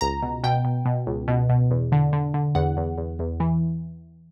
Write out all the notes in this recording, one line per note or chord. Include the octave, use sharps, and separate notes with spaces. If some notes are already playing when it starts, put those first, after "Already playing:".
C#2 A#5
B2
B2 G5
B2
B2
C#2
B2
B2
E2
D3
D3
D3
E2 F#5
E2
E2
E2
E3